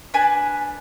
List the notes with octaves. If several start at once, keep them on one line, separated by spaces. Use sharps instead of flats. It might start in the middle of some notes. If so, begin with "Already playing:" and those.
D4 B4 G#5 A5